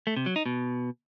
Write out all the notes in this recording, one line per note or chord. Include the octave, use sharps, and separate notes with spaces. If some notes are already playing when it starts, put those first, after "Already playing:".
A3
C3
F#3
D#4
B2